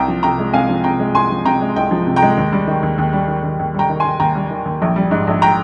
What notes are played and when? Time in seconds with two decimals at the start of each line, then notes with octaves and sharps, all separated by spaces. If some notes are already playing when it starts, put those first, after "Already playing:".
Already playing: C2 G5 A#5
0.08 F3
0.23 C3 G5 A#5
0.39 G#3
0.53 C2 F5 G#5
0.69 F3
0.84 C3 G5 A#5
1.00 G#3
1.15 C2 G#5 C6
1.30 F3
1.45 C3 G5 A#5
1.61 G#3
1.76 C2 D#5 G5
1.91 F3
2.07 C3
2.16 G5 A#5
2.22 G#3
2.37 D#2
2.53 G3
2.67 D#3
2.83 D#2
2.98 D#2
3.13 G3
3.28 D#3
3.43 D#2
3.59 D#2
3.74 G3 G5 A#5
3.89 D#3
4.00 D#2 G#5 C6
4.20 D#2 G5 A#5
4.35 G3
4.51 D#3
4.66 D#2
4.82 A#1
4.96 G3
5.11 G#2
5.27 A#1
5.42 G5 A#5